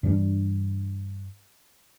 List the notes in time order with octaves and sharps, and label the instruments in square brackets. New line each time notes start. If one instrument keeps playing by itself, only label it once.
[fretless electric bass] G2 E3 G3 D4